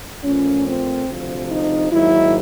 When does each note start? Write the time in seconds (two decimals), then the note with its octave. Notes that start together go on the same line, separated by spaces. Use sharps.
0.24 A#2 F3 A3 C#4
0.66 C4
1.07 D2 C3 F3
1.50 D#4
1.91 G#2 D#3 F#3 A#3 E4